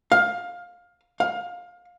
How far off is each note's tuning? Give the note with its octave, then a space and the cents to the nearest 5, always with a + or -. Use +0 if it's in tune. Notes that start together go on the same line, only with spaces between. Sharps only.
F5 +15
F5 +25